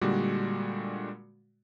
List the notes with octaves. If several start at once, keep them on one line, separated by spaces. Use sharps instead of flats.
A#2 D3 G3 G#3 F#4